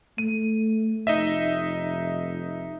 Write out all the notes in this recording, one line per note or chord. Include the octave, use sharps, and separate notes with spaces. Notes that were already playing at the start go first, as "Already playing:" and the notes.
A3 D#7
F1 D#4 D#5 E5